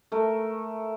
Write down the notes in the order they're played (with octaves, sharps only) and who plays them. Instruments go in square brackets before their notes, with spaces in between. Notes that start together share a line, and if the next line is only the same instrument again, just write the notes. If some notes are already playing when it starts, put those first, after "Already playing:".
[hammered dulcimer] A3 A#4